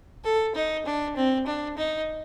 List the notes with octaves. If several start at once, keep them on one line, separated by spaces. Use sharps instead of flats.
A4
D#4
D4
C4
D4
D#4